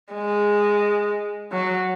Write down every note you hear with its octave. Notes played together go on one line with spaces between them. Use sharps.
G#3
F#3